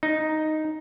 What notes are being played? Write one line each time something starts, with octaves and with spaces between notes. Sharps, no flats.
D#4